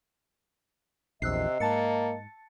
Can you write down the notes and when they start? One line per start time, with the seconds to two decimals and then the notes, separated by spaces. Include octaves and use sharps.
1.22 A#1 E2 C3 D#5 E6 F#6 C7
1.60 G#2 A#3 A5 A6 C#7